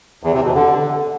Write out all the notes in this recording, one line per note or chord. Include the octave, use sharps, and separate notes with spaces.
E2
C3
B2
D3